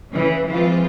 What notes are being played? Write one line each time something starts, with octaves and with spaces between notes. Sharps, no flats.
C#3 E3
E3 F3 G#3 C4 F4